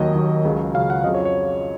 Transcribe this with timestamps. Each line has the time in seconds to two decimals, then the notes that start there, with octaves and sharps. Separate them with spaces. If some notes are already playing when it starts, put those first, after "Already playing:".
Already playing: D#2 D#3 F#3 D#5
0.14 D#2 D#3 F#3
0.45 C#2 C#3 F#3
0.74 C#2 C#3 F#3 F5
0.90 F#5
1.04 F2 C#3 F#3 D#5
1.15 C#5
1.25 C#5